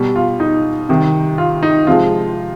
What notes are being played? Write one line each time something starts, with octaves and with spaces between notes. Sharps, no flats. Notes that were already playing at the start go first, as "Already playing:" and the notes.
Already playing: B2 G3
F4
D#4
C3 D#3 G3
F4
D#4
C3 F3 G#3 F4